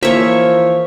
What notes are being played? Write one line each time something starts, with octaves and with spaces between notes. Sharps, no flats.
E3 F3 A#3 C#5 E5